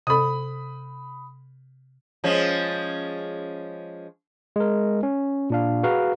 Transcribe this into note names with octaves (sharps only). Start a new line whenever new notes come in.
C3 A4 B5 D#6
F3 G#3 C#4
G#3 A#4
C#4
A#2 D4 F5
F#4 G#4 B4 F5 A#5